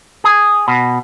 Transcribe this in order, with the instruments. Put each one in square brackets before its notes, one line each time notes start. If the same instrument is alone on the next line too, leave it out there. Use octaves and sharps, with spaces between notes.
[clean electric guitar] G#4
B2